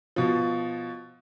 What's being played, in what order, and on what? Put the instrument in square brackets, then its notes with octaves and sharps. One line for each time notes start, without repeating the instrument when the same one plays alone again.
[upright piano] B2 F3